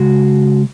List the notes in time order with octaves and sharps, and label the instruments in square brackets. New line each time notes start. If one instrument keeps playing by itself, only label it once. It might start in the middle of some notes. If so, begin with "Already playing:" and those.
Already playing: [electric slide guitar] C#3 G#3 F#4